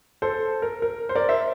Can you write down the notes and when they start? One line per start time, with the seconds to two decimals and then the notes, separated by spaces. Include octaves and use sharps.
0.22 A4 C5
0.62 A#4
0.82 A#4
1.09 C5
1.15 A#4 D5
1.29 C5 E5